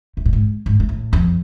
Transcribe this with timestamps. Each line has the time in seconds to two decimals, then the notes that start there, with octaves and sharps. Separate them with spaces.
0.17 G#2
0.26 A2
0.33 G#2
0.66 G#2
0.80 G#2
0.89 A2
1.13 F2